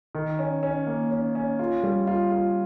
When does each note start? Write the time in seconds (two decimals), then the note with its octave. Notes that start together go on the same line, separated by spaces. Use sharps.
0.15 D#3
0.39 C#4
0.63 C#4
0.87 A#3
1.11 C#4
1.35 C#4
1.59 F4
1.83 G3
2.07 F4
2.32 F4